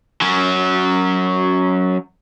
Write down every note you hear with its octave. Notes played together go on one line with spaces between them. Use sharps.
F#3 C#4